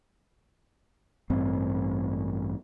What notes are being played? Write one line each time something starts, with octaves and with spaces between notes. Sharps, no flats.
A1 G2 C4